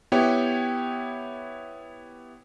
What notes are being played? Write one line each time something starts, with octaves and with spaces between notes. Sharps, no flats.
B3 E4 G4 C#5 G5